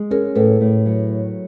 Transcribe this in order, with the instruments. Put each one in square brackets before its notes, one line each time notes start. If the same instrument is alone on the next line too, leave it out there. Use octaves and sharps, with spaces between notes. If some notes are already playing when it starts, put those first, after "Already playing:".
Already playing: [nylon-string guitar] G#3
[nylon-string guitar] C#4 [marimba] G#4 A#4
[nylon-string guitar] A2 [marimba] A4 B4
[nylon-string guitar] A2
F#3